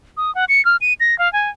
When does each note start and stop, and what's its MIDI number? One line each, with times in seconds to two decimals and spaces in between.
0.17 0.33 87
0.35 0.45 78
0.49 0.64 97
0.65 0.76 89
0.81 0.93 99
1.00 1.17 94
1.19 1.31 77
1.33 1.50 80